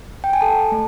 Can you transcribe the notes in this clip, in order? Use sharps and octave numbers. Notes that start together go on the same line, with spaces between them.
G5
G#5
A4 A5
A3